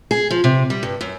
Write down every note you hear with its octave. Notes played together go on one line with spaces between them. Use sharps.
G#4
F3
C3
G3
G2
F#2